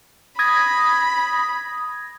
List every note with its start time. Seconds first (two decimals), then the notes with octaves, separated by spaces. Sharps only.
0.39 B5 D#6 G#6 A#6